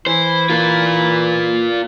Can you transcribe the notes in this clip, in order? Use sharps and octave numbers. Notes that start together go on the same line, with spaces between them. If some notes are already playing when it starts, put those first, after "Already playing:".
E3 E4 C5
F4 A#4